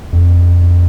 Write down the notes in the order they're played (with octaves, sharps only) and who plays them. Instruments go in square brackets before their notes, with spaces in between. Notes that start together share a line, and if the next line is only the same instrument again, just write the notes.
[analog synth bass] F2